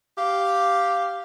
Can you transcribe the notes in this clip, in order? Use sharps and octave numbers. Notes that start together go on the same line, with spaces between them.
G4 F5